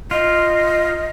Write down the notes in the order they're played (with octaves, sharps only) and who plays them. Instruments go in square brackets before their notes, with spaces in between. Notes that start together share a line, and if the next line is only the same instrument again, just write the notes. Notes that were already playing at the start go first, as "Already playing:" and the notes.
[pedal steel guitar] F4 [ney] D#5